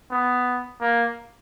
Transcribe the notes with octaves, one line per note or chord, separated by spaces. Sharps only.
B3
A#3